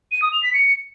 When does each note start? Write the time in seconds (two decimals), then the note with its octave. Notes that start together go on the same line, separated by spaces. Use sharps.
0.12 D#7
0.22 D#6
0.32 F7
0.43 B6
0.53 C#7